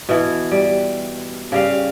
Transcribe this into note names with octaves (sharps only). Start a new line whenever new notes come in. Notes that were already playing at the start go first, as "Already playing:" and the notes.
B2 E3
G3
C#3 G3 F5